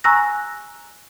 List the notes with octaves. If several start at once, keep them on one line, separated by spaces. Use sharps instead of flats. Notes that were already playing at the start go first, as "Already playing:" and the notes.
G#5 A#5 C#6 E6 F#6 A#6